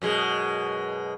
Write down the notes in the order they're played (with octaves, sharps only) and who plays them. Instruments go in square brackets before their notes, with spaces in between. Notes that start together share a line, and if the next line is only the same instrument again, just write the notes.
[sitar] F#2 B2 G#3